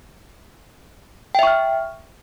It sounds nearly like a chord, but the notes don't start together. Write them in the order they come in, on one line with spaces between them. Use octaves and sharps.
G5 E5 C#6 F6